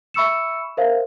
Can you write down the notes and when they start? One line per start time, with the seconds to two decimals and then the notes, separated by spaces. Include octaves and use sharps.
0.14 E5 B5 C#6 E6 C#7 E7
0.77 A#4 C5 E5 F5